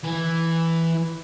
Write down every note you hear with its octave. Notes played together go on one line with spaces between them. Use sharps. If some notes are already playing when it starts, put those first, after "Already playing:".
E3